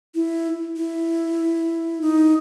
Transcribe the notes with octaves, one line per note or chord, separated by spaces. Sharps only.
E4
E4
D#4